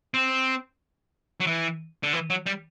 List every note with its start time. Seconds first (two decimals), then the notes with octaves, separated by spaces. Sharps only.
0.14 C4
1.40 F#3
1.47 E3
2.03 D3
2.13 E3
2.30 F#3
2.46 G3